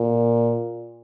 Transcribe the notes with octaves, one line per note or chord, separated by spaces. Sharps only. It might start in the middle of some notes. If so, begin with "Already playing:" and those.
Already playing: A#2